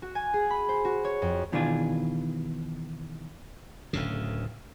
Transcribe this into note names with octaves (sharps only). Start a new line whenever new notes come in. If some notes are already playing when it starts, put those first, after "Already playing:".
F#4
G#5
G#4
B5
C5
F#4
C#5
F2
B2 D#3 E3 D4 F4 G#4
D1 D2 C#3